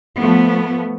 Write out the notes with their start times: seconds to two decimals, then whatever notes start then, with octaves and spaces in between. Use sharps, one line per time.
0.19 F3 A3 B3